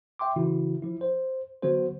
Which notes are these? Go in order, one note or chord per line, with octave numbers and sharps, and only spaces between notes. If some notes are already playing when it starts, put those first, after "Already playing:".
E5 G5 C6 D6
C#3 E3 E4 F#4
F3 E4
C5
D3 F#3 B3 F#4 C5